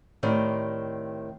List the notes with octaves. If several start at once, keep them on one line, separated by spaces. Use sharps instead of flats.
A2 D#3 C4 G4 D5